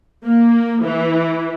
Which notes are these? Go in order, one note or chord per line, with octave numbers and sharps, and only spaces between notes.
A#3
E3